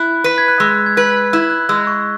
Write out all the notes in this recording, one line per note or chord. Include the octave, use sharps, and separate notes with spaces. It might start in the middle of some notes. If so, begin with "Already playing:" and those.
Already playing: E4 F#6
B4 B6
G#6
F#6
G#3 E6
G#6
B4 F#6
E4 E6
F#6
G#3 E6
C#6